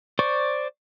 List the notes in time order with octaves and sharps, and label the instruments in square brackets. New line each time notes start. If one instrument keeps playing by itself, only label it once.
[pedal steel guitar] C5 D5 C#6